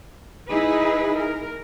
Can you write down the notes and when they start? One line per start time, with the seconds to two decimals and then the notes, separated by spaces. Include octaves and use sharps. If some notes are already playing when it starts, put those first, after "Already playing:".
0.48 D#4 E4 G#4 B4
1.17 A#4